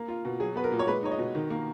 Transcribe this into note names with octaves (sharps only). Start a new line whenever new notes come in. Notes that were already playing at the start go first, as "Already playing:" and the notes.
Already playing: A#3
F4
B2
F#3 G#4
B3 B4
A#4
A#2
C#5
G#3 B4
D#4 C#5
D#5
B2
D#3
A#3